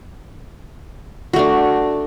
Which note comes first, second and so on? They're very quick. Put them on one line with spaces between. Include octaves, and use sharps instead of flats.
F#4 A3 D4